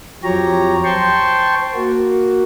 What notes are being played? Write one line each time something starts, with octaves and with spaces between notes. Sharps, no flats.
F2 F3 F#3 G4 C#5 A#5
C5 G5 A5 C6 C#6
A#3 F#4